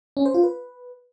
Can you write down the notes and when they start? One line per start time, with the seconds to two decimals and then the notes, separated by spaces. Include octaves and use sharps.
0.17 C#4
0.25 C5
0.34 F4
0.43 B4